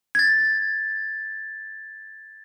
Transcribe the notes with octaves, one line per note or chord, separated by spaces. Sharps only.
G#6 A6